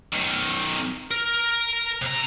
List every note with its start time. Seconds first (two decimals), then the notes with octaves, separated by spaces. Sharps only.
0.13 B1 D#3
1.11 A#4
2.02 C3 A#5